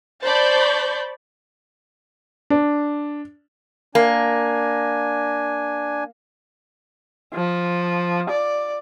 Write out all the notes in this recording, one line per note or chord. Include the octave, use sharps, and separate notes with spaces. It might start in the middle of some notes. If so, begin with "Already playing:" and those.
C5 D5 A5 B5 C#6 G6
D4
A#3 D4 G#5
F3
D5